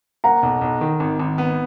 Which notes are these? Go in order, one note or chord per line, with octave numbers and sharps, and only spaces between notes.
A#3 F#5 A#5
B1
B1
D#3
G#1
G#1
B3